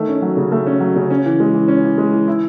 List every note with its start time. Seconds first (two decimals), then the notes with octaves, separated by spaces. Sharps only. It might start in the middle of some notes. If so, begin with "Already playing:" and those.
Already playing: D#3 A3
0.08 C#4
0.22 F#3
0.37 C#3
0.52 A3
0.67 C#4
0.80 F#3
0.96 C#3
1.10 C#4
1.25 E3
1.40 G#3
1.54 E3
1.68 C#4
1.84 E3
1.98 G#3
2.13 E3
2.28 E4